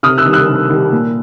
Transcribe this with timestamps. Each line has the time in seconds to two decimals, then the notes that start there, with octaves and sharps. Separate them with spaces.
0.03 C3 D#6 F6
0.18 E6 F#6
0.25 D#3 G3
0.33 E6 F#6
0.48 C3
0.70 D#3 G3
0.92 A#2